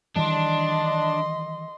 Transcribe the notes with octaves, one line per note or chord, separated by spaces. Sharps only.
D#3 E3 G3 D4 D#5 C6